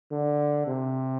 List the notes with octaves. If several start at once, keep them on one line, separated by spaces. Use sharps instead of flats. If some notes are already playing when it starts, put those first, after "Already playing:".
D3
C3